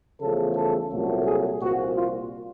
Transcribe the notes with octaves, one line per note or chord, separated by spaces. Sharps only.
E2 C#3 F3 A3 A4
A4
C2 A#2 F#3 A3
G#4
C2 A#2 F3 F#4
F4